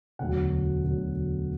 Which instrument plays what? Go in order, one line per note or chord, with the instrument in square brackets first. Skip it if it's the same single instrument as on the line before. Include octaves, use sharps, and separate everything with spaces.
[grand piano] E1 D2 D3 F#3 F#5
E1 D2 D3 F#3